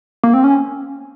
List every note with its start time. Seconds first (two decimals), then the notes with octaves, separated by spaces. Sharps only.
0.24 A#3
0.34 C4
0.44 C#4